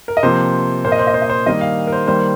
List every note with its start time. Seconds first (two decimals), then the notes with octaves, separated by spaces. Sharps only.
0.08 A#4
0.17 D#5
0.23 C3 F3 A#3 C5
0.84 A#2 A#3 C5
0.92 D#5
0.99 C5
1.07 D#5
1.14 C5
1.22 D#5
1.29 C5
1.46 D#3 G3 A#3 D#5
1.61 F5
1.87 A#4
1.92 C5
2.07 D#3 G3 A#3 C5